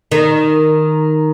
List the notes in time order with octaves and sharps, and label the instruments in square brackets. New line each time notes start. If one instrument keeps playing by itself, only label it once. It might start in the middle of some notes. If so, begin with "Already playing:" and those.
[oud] D#3